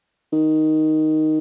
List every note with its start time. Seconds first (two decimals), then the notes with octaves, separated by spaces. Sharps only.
0.33 D#3